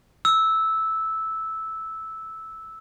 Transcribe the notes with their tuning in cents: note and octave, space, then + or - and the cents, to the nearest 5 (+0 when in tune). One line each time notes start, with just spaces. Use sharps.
E6 -10